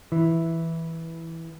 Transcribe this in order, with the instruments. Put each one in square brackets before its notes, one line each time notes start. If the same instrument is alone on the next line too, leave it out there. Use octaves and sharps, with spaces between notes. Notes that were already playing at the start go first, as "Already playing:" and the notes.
[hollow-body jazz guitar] E3